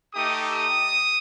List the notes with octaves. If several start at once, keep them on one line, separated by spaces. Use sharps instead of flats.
A3 D#4 G4 D#6
D#6